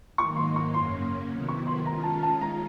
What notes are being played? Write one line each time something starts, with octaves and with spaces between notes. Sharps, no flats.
G#2 D#3 F#3 A#3 D#4 C#6
C6
C#6
F#2 C#3 F#3 A#3 C#4 C6
C3 D#3 F#3 B3 E4
C#6
C6
D#3 G#3 C#4 F4 A#5
A5
A5
A#5